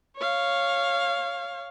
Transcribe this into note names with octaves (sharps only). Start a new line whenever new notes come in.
C#5 F5